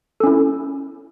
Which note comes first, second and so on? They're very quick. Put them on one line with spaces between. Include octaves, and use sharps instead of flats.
A4 C#4 E4